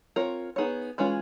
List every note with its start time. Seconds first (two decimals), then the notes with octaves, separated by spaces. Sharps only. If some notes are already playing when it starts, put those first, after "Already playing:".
0.16 C4 F4 A#4 C#5
0.56 B3 D#4 G#4 C#5
0.98 E3 G#3 C#4 F4 G#4